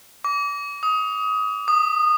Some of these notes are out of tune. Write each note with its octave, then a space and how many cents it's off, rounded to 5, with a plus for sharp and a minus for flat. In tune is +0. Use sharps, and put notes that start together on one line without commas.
D6 -30
D#6 +20
D#6 -20